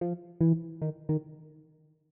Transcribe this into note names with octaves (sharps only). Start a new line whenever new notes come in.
F3
E3
D#3
D#3